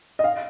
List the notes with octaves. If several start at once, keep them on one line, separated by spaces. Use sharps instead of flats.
D#5
F5